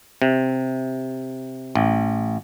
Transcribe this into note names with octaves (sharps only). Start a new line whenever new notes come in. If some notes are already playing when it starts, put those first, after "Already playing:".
C3
A1